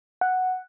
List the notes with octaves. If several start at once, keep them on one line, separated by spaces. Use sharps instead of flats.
F#5